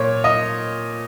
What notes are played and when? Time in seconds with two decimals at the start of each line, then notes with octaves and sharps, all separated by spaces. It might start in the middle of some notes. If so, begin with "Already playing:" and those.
Already playing: A#2 C#5
0.24 D#5